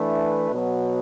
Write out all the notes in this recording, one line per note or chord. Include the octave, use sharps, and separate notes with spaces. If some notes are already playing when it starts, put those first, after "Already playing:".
Already playing: E3 A3 D4 B4
B2 F#3 B3